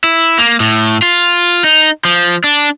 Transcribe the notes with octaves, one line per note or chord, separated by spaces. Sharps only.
E4
A#3
A2
F4
D#4
F3
D4